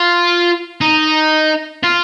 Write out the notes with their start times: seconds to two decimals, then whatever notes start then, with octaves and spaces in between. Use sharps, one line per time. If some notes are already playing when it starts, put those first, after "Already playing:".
Already playing: F4
0.81 D#4
1.83 F4